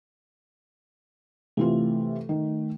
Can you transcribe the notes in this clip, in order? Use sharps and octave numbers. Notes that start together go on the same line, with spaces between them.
C3 E3 A3 F4
D#3